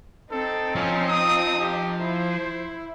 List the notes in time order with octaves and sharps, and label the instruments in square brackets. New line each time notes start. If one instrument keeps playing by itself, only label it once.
[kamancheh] C4 D#4 [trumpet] A4
[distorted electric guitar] F3 [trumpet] C#4
[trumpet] D#6
G4
[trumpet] E4 [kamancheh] C5